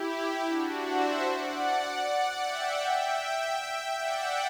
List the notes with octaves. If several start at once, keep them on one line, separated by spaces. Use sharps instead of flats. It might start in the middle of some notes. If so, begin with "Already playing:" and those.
Already playing: E4 G4
D4 F#4
C5 E5
D5 F#5
D5 F#5
E5 G5
E5 G5
D5 F#5